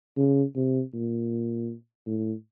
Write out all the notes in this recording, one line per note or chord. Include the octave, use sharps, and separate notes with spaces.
C#3
C3
A#2
A2